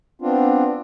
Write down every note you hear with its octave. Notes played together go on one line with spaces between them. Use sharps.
B3 C4 D4 F4